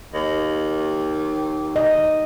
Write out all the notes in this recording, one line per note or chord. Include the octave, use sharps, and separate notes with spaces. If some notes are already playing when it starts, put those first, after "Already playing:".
D#2
D#5